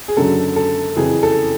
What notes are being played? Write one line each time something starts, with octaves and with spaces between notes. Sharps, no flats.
G#4
F#1 F#2 D3 F#3 A4
A4
F#1 F2 C#3 E3 G#4
A4